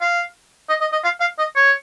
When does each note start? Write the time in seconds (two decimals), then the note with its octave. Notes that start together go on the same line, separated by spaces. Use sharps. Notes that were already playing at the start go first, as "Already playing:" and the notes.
0.01 F5
0.69 D#5
0.81 D#5
0.93 D#5
1.04 F5
1.21 F5
1.39 D#5
1.56 C#5